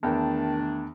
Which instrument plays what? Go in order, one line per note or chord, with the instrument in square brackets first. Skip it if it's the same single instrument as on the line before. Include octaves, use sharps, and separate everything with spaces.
[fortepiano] E2 [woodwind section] D#3 A3 D4 [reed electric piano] A#4 G5 A5